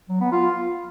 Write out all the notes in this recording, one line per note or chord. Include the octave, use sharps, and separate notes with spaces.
F#3
B3
F4